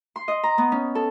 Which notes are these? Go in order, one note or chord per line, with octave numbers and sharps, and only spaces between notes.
C6
D#5
A#5
B3
C#4
A4